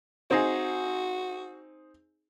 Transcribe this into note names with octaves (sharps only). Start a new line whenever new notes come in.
C4 D#4 F#4 G#4